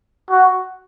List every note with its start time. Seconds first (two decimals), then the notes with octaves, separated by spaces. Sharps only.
0.30 F#4